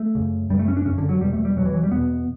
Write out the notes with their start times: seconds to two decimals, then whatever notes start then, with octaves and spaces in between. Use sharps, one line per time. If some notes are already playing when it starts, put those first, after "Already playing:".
Already playing: A3
0.15 F#2 C#3
0.50 F#2 G3
0.54 C#3
0.59 A3
0.68 C#4
0.77 D4
0.85 F#2 C#3 C#4
0.98 D3
1.09 F#3
1.20 E2 B2 G3
1.33 A3
1.45 G3
1.56 E2 B2 F#3
1.65 E3
1.73 F#3
1.83 G3
1.91 E2 B2 B3